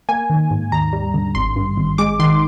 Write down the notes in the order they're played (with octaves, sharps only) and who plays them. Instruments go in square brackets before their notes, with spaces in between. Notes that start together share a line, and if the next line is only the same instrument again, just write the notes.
[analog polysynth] A#3 G#5
D#3
G#2
D#2 A#5
G3
D3
G#1 C6
G2
G#1
G#3 D6
D#3 C6